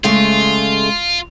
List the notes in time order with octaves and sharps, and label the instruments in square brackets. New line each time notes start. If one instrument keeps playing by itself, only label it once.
[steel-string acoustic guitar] C#3 G#3 A3 [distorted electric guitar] F4